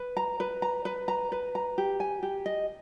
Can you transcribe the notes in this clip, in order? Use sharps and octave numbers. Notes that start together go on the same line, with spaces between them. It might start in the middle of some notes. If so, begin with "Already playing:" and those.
Already playing: B4
A#5
B4
A#5
B4
A#5
B4
A#5
G4
G#5
G4
D#5